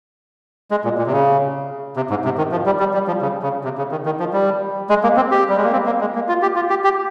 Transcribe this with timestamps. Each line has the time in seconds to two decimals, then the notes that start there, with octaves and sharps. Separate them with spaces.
0.71 G#3
0.84 A#2
0.98 A#2
1.07 C3
1.12 C#3
1.96 C3
2.10 G#2
2.25 C3
2.38 D#3
2.52 F3
2.66 G3
2.79 G3
2.94 G3
3.07 F3
3.21 C#3
3.42 C#3
3.64 C3
3.78 C#3
3.91 D#3
4.06 D#3
4.20 F3
4.33 G3
4.90 G#3
5.03 A#3
5.16 C4
5.31 G4
5.49 G3
5.57 G#3
5.64 A#3
5.72 C4
5.86 A#3
6.01 G#3
6.15 A#3
6.29 F4
6.42 G4
6.56 F4
6.70 G4
6.84 G4